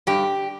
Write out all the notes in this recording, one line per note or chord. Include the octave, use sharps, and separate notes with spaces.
G2 G4